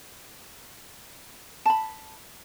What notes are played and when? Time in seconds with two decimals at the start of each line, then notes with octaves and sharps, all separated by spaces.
1.66 A5 B5